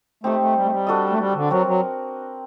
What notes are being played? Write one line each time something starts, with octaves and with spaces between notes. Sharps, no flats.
A3 C4 D#4 G4
A3
G3
A3
G3
D4 F#4 A4 D#5
A3
G3
D3
F#3 C4 F#4 A#4
F#3